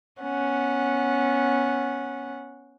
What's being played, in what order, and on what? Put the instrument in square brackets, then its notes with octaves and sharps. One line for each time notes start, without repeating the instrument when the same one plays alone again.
[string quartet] B3 C#4 F#5